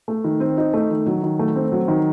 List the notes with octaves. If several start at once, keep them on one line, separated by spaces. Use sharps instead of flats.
A3
D#3
C4
D#4
A3
D#3
F#3
D#3
A3
C4
F#3
D#3